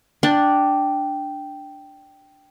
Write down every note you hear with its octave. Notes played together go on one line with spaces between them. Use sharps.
D4 G5